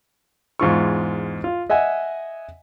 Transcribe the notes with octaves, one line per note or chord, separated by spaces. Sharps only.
E2 G#2 F4 C#6
F4
D#5 E5 F#5 G#5